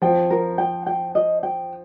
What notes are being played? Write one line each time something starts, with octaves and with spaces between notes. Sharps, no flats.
F3 G5
A#4
G5
G5
D#5
G5